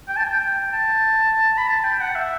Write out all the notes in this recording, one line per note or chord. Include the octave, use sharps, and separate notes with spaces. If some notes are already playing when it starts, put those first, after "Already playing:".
G5
A5
G5
A5
B5
A5
G5
F#5
E5